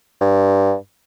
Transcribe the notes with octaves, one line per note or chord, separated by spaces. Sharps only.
G2